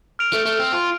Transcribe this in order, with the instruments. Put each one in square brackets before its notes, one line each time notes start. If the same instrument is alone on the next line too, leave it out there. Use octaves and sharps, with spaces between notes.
[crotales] F6 D7 F7
[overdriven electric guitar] A3
A3
C4
F4